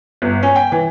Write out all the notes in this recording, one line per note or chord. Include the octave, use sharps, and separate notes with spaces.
G1
C#4
G5
E3